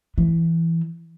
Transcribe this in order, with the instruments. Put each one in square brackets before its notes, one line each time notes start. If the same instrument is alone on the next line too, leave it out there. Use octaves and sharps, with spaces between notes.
[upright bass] E3